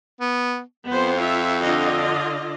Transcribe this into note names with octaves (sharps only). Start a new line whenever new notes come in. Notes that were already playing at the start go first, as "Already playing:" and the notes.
B3
F2 B3 C5
F4 E5
D3 F4 D#5